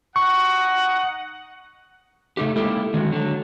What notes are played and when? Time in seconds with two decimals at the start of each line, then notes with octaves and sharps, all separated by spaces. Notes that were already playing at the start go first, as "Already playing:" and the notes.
0.16 D#4 F#5 C#6
2.37 C#3 A3 D#4 G4
2.56 G#3 A#3 E4 G4 A4
2.94 D3 D#3 G#3 F#4
3.11 D3 F#3